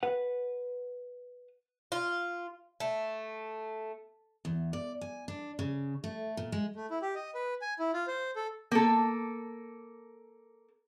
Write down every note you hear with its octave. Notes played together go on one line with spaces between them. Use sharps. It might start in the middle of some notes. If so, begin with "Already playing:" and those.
B4 F#5
F4
A3
E2
D5
G#5
D4
C#3
A3
A#2
G#3
A3
E4
G4
D#5
B4
G#5
E4
F4
C5
A4
A#3 A4